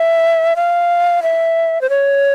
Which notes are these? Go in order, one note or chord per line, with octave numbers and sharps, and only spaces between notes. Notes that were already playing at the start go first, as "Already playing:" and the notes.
Already playing: E5
F5
E5
C5
C#5